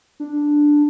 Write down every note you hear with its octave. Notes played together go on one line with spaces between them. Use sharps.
D4